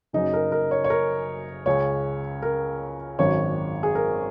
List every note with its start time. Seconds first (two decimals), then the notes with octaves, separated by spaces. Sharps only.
0.13 F#1 F#2 C#3 D#4
0.33 A#4
0.52 A#4
0.71 C#5
0.84 C#5
0.90 A#4
1.66 C#2 C#3 C#5
2.42 A#4
3.19 G#1 F#2 D#3 C#5
3.83 G#4
3.95 A#4